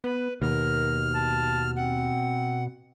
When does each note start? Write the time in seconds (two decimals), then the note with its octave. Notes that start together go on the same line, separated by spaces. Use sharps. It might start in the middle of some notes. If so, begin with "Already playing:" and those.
0.04 B3 B4
0.42 D#2 B2 A#4 F6
1.15 A5
1.76 C4 F#5